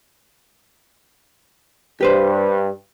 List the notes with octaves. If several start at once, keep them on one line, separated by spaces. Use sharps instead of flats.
G2 G4 B4 C5